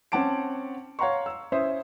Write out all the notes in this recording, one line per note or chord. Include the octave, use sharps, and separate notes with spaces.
C4 C#4 F#5 A5 D6 D7
C#5 F5 F#5 A#5 C6 C#6
E6
C#4 E4 C5 E5 D#6